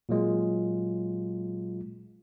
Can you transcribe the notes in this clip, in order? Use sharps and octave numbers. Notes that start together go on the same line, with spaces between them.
A#2 F#3 G#3 F4